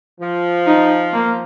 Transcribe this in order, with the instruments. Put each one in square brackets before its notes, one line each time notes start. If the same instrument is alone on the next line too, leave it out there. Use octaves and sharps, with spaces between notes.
[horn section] F3
[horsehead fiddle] D#4
A#3